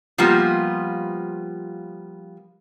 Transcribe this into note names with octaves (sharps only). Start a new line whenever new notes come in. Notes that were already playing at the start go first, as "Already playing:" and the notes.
F3 G3 A#3 B3 F4